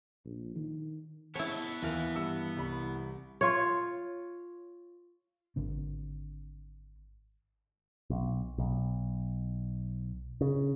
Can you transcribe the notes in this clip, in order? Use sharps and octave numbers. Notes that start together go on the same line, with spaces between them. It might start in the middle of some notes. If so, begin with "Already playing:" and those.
A#1
D#3
B3 E4 C#5 A5
D#2 E3 A#4
G2 E6 C#7
C2 B5
F4 C#5
G#1 D3 C4
B1
B1
C#3